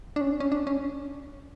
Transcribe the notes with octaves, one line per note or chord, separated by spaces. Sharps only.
D4
C#4
D4
C#4
D4
C#4